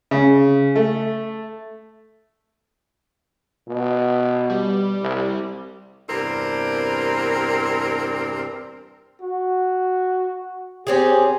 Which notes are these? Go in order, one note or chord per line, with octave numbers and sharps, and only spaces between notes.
C#3
A3
B2
G3
C2
E2 G2 C3 C4 D4 A#4
F#4
C4 C#4 G4 G#4